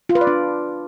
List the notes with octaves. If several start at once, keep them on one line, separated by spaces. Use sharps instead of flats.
F4
B4
D5
D4